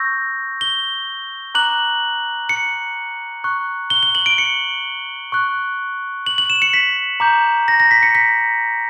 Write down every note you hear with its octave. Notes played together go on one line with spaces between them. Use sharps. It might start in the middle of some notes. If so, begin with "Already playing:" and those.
Already playing: C#6 E6 G6 A#6
G7
A#5 D6 F#6 F#7
C#7
C#6 F#6
G7
G7
F#7
D7
C#7
C#6 F#6
F#7
F#7
E7
C#7
B6
A#5 D6 G6
A#6
A#6
B6
C#7
B6